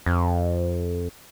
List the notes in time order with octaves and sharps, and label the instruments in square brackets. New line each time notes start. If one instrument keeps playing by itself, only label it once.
[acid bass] F2